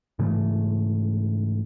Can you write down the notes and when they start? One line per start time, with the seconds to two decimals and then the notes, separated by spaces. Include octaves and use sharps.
0.19 G#2 C#3 E3 A3